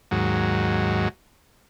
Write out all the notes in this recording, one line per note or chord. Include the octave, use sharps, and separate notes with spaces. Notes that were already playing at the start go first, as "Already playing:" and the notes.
D#2 G#2 F#3